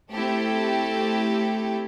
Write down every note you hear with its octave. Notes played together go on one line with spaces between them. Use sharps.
A3 C4 E4 G4 A4